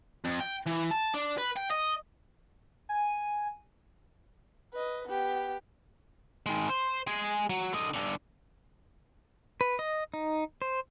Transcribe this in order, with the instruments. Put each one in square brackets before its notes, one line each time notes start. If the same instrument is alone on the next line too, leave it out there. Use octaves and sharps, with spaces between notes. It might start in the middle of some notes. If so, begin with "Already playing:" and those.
[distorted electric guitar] F2
G5
E3
A5
D4
B4
G5
D#5
[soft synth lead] G#5
[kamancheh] B4 D#5
B3 G4
[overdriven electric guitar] D#3 G#3
C5
G#3 G#4
F#3
D3 D#5
G2 D3
[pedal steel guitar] B4
D#5
D#4
C5